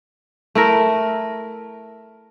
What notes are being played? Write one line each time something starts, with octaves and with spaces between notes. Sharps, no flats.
A3 E4 A#4